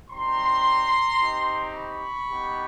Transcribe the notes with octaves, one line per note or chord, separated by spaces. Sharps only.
G3 C4 D#4 A#5 C6
C4 D#4 G4
B5 C#6
B3 D#4 G4